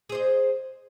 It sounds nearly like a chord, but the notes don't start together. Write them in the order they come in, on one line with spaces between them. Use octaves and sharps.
G#4 C5 D#5